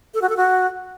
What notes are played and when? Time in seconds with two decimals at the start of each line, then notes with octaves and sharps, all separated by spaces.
0.14 A4
0.22 F#4
0.29 A4
0.37 F#4